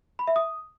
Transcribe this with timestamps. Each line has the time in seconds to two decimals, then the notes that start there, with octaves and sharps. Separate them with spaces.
0.19 B5
0.27 E5
0.36 D#6